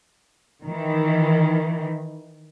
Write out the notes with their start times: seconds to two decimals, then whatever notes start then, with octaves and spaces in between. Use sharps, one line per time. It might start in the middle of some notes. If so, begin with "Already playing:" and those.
0.65 D#3 E3